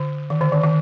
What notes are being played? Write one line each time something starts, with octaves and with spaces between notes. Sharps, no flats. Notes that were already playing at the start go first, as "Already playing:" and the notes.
Already playing: D3
D#3
D3
D#3
D#3